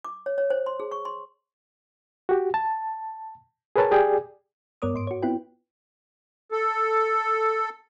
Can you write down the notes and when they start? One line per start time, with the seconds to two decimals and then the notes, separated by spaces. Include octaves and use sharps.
0.05 D6
0.26 C#5
0.38 C#5
0.50 C5
0.66 C6
0.80 G#4
0.91 C#6
1.05 C6
2.29 F#4 G4
2.54 A5
3.76 G#4 A#4 B4 C#5 A5
3.92 G4 G#4 D5 G5
4.82 G2 B3 A#4 C#5 D6 D#6
4.94 G#2 C6 D7
5.07 F#4 C#5
5.22 B3 C4 E4 F4 B4 G5
6.52 A4